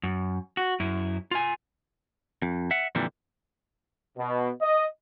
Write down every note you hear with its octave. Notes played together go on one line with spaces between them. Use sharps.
F#2
F#4
F#2 E4
F4 G#5
F2
E5 F#5
F2 A#2 D3 E3 G3
B2
D#5